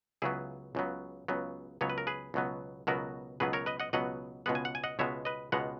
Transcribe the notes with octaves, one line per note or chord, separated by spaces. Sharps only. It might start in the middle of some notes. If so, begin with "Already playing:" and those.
C#2 C#3 F#3 B3 E4 G#4
C#2 C#3 F#3 B3
C#2 C#3 F#3 B3
C#2 C#3 F#3 B3 C#5
B4
A#4
G#4 B4
C#2 B2 F#3 B3
C#2 B2 F#3 B3 F#4 A#4
C#2 B2 F#3 B3 G#4 B4
A#4 C#5
B4 D#5
D#5 F#5
C#2 B2 F#3 B3 D#5 F#5
C#2 B2 G#3 B3 F#5
G#5
F#5
G#5
D#5 F#5
C#2 B2 G#3 B3 C#5 E5
B4 D#5
C#2 B2 G#3 B3 F#5 A#5